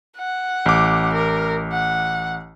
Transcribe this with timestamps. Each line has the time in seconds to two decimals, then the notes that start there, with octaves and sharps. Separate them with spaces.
0.17 F#5
0.66 A1 D6
1.13 A#4
1.72 F#5